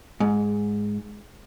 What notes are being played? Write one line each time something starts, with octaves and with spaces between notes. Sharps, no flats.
G#2